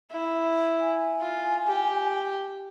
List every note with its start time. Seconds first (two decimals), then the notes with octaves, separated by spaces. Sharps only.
0.12 E4
0.80 G#5
1.21 F4
1.68 G4